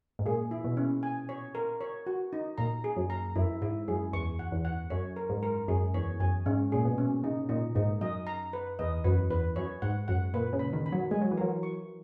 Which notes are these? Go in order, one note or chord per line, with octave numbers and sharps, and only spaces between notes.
G#2
A#2 G#4
E4
B2
C#4
G#5
C#5
A#4
C#5
F#4
D#4
A#2 A#5
G#4
F#2
A#5
F#2 E4
G#2 E4
F#2 G#4
E2 C#6
F#5
E2
F#5
F#2 C#5
A#4
G#2
A#4
F#2 G#4
E2 C#5
F#2 G#5
G#2 C#4
A#2 G#4
B2
C#4
C#3 D#4
A#2 D#4
G#2 D#4
F#2 D#5
A#5
B4
E2 D#5
F#2 B4
E2 B4
F#2 C#5
G#2 F#5
F#2 F#5
A#2 B4
C#3
B5
D#3
B5
F#3
G#3 G#5
F#3
E3
F#3 A#4
C#6